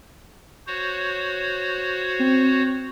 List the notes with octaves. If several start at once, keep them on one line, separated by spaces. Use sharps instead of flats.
F#4 C5 C#5
C4